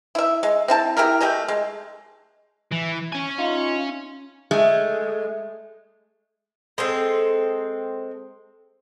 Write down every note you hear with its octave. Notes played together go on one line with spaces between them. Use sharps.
E4 E5
G#3
C4 E4 A5
E4 G4 G#4 A#4
A3 G4 D#5 G#5
G#3
E3
C#4 G#5
D#4 F4
G#3 A3
G#3 C4 A4